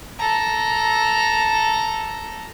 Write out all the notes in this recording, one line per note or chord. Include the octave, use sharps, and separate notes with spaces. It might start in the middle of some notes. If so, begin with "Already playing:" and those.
A4 A#5